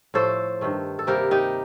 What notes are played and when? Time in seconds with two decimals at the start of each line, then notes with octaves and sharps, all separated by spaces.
0.14 A2 F3 A3 A4 C5
0.61 G2 D#3 A3
0.99 A4
1.07 C3 G3 A#3 G4 A#4
1.31 D#4 G4